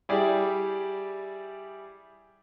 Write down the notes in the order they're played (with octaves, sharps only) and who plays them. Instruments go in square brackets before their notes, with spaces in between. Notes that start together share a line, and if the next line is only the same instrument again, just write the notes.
[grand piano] G3 E4 G4 G#4 D5